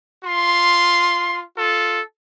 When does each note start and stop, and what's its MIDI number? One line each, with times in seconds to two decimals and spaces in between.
0.24 1.40 65
0.24 1.40 84
1.57 1.99 65
1.57 1.99 69